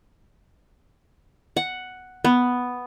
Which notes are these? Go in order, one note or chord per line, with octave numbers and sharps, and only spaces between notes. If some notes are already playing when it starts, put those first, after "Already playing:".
F#5
B3